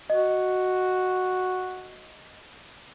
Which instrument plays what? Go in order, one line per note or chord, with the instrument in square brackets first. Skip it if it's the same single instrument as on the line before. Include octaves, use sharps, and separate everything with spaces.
[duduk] F#4 [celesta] D#5